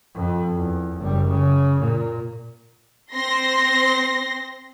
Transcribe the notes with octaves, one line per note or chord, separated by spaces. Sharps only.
F2
E2
F#1 G3
C#3
A#2
C4 C6 A#6